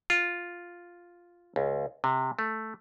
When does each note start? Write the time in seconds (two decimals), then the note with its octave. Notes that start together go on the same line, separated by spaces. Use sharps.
0.10 F4
1.56 C#2
2.04 C3
2.39 A3